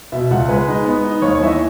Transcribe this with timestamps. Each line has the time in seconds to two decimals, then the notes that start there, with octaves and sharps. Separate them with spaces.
0.12 B2 E5
0.31 C#2 F#5
0.48 G#3 B4
0.68 D#4
0.86 B3
1.04 D#4
1.22 D#2 C#5
1.35 C#5
1.41 E3 E5
1.47 D#5